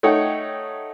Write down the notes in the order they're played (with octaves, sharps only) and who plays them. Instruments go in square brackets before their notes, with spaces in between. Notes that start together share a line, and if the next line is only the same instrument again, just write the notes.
[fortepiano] A3 D#4 C#5 F#5 G5